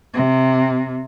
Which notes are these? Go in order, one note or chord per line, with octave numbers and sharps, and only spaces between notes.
C3